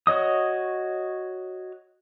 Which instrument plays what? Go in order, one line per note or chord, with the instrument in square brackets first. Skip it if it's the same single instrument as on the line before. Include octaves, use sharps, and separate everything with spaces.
[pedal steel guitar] F#4 C#5 D#5 D#6